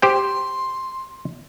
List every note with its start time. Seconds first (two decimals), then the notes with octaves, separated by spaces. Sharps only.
0.02 G4 C5 G5 C6